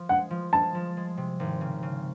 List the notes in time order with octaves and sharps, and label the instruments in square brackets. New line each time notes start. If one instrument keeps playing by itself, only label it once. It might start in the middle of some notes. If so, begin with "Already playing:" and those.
Already playing: [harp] F3
[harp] G#3 [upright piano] F#5
[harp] F3
[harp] G#3 [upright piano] A5
[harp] F3
G#3
C3
G#1
C#3
C#3